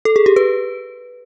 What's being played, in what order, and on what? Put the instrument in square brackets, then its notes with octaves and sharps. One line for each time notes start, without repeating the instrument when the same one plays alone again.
[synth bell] A4
G#4
G4
B4